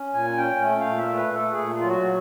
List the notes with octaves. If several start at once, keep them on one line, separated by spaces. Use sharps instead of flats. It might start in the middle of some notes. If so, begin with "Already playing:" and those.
Already playing: C#4
A#2 G#5
C#4 G5
A3
F5
A#2
E5
A3
B4
A3 A4
G#4
A#2
F#3 F4
F#4